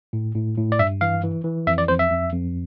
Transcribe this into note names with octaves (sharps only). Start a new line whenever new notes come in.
A2
A2
A2
D5
G2 E5
E3 F5
E3
E3
F2 E5
D5
F2 C5
E5
F2
F2